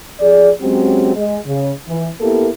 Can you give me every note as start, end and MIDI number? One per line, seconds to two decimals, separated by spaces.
0.21 0.51 41
0.21 0.51 68
0.21 0.51 74
0.61 1.13 54
0.61 1.13 56
0.61 1.13 60
0.61 1.13 61
0.61 1.13 66
0.61 1.13 67
1.15 1.39 56
1.47 1.72 49
1.88 2.08 52
2.21 2.49 58
2.21 2.49 59
2.21 2.49 64
2.21 2.49 67
2.21 2.49 69
2.21 2.49 70